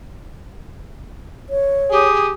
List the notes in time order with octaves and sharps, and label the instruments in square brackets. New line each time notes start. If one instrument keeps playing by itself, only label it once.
[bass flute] C#5
[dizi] G4 [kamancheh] G#4 D#6